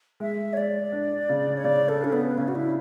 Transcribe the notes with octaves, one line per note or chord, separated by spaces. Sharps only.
G#3 E5
C#5
G#3 D5
D4
C#3
C#5
C#3 D5
A4
C#4 D4
B3
C#3 C#4
F#4
E4